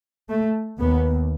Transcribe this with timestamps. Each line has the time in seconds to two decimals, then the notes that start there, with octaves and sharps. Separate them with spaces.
0.29 A3
0.79 D#2 B3